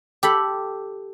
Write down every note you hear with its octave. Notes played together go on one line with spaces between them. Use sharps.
G4 A4 B5